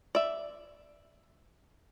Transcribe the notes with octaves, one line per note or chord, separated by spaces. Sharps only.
D5 E5